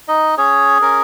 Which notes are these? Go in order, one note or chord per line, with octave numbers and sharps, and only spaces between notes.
D#4 D#5
C#4 G#4 C#5
C#4 A#4